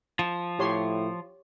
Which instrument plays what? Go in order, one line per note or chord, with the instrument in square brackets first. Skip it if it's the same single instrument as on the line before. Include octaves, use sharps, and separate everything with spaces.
[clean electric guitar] F3
[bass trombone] A2 [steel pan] G4 C#5 C6